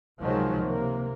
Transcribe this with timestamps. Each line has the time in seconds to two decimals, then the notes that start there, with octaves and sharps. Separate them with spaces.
0.21 C#2 C3 D#3 F3 F#3 G#3
0.60 C3 A#3